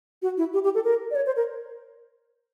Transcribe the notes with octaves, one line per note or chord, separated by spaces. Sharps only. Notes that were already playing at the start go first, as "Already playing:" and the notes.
F#4
E4
G4
G4
A4
A#4
D5
C#5
C5
A#4